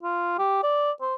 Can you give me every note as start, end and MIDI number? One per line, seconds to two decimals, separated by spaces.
0.03 0.37 65
0.38 0.60 67
0.63 0.91 74
1.01 1.15 72